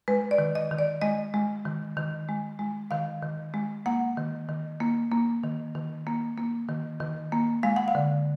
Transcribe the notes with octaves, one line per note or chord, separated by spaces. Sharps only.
G#3 B4
D5
D#3
D#5
D#3
D5
G#3 D#5
G#3
D#3
D#3
G#3
G#3
D#3 F5
D#3
G#3
A#3 F#5
D#3
D#3
A#3
A#3
D#3
D#3
A#3
A#3
D#3
D#3
A#3
G#3 F5
F#5
F5
D3